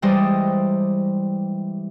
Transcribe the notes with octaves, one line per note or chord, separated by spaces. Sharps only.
E3 G3 G#3 C5 D5 D#5